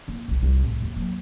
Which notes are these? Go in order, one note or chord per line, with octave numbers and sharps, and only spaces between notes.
A#3 E4
E1 B1
C2
A2
D#2
F#3 A#3